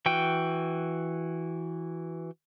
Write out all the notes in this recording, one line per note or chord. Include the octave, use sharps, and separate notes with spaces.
E3 F#4 G5